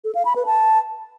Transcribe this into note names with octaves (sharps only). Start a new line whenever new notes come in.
A4
F5
B5
B4
A5